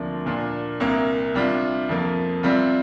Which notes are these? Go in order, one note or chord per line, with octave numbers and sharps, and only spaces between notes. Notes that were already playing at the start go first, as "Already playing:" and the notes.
Already playing: D2 C3 F3 A#3 D4
A#2 A#3 D4 F4
C2 C3 A#3
C3 G3 D4 F4
F2 F3 A#3
C3 G3 C4 F4